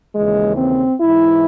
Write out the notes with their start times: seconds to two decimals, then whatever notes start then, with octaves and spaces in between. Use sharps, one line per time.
0.15 D#2 C#3 E3 G#3
0.57 C4
1.00 G#2 E3 E4